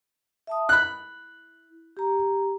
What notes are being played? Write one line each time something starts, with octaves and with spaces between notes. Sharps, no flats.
E5 A5 D#6
E4 B5 F#6
G4 A#5